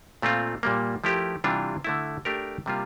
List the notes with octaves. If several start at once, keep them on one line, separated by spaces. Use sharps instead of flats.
A#2 A3 C4 F4
A#2 G3 A#3
F3 A3 E4 G4 A#4
C3 E3 G3 D4 F4
D3 A3 E4
A3 D4 G4 A#4
C3 G3 A#3 F4